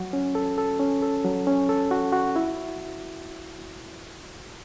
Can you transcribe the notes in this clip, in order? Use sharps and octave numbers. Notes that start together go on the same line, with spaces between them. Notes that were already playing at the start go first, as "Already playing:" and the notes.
Already playing: F#3 F#4
C#4
A4
A4
C#4
A4
F#3
C#4
A4
F#4
F#4
E4